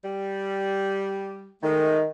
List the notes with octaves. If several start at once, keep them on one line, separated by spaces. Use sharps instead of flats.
G3
D#3 G#3 A3